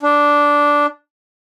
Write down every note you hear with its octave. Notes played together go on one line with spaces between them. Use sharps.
D4